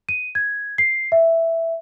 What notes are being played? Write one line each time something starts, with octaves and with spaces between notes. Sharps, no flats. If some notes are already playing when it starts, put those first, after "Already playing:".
D#7
G#6
C7
E5